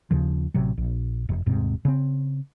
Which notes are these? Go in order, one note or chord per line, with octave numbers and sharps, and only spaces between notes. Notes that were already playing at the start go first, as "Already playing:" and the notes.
D#2 C#3 F3
A1 C3 F#3
A#1
F1
D#1 G#2 C3
C#3 C4